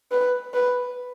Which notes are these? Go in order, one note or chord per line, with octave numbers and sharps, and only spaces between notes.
B4
B4